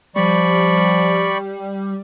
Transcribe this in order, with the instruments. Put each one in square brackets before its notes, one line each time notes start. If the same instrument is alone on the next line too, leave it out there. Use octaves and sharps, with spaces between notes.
[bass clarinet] F3 [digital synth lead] G3 [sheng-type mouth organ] D5 B5 C#6